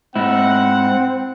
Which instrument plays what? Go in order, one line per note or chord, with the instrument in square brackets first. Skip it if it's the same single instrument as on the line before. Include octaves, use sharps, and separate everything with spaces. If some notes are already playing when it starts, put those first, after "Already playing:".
[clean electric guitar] G#2 E4 [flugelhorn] C4 [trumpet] F#5